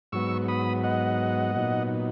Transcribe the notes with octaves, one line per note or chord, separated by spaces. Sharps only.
G#2 F#3 B3 C#6 E6
B5 D#6
D#5 F#5
A#2 F#3 B3 D#4